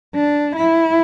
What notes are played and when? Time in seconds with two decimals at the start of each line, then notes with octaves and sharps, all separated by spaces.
0.15 D4
0.56 E4